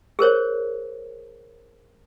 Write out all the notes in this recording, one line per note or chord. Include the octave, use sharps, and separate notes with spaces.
G#4 A#4 C5 C#5